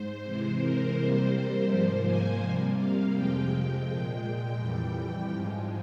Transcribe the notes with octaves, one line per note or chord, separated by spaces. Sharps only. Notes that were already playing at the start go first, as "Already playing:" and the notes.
Already playing: G#2 C5
C3 E3 G#3 C5
A#4
C3 G3 A#3 C5
G#2 F3 A#3
G#5
C3 G3 A#3
F5
F2 C3 F3 G#3 G5
A#2 G#3
F2 E3 G3 G5
G#2 F3 G#3